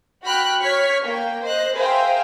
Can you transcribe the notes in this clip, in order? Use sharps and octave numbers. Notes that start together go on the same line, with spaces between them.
F#4 G5 B5 F6 F#6
C#5 C#6 F6 G#6 B6
A#3 G5
C5 D#5 F#6
G#4 A#4 C5 E5 F5 G5